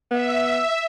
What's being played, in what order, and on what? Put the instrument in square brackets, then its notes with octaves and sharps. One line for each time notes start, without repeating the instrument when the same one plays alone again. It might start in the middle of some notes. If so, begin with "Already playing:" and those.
[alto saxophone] B3 [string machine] E5